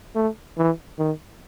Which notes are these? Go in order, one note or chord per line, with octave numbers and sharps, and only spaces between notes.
A3
E3
D#3